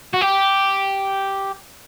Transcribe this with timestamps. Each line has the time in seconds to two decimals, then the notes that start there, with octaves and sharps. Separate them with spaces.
0.13 F#4
0.21 G4